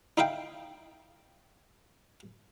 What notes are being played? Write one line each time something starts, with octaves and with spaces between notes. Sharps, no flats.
D#4 E4 E5 F5 G5